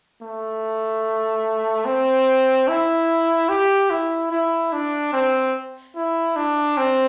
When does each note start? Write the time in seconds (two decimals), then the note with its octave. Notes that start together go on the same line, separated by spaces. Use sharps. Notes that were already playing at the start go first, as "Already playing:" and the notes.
0.22 A3
1.85 C4
2.68 E4
3.49 G4
3.91 E4
4.31 E4
4.73 D4
5.13 C4
5.96 E4
6.36 D4
6.78 C4